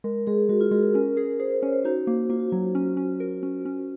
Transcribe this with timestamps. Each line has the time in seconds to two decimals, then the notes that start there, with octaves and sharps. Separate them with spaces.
0.04 G#3 A#4
0.27 G#3 G#4
0.49 G#3 F#4
0.61 F4
0.71 G#3 G#4
0.83 A#4
0.94 C#4 A#4
1.16 G#4 A#4
1.40 G#4 C5
1.51 C5
1.62 C#4 C#5
1.73 C5
1.84 D#4 F#4
2.07 A#3
2.29 A#3 F4
2.40 F#4
2.50 F#3 F4
2.75 C#4
2.97 C#4
3.20 A#4
3.43 C#4
3.65 C#4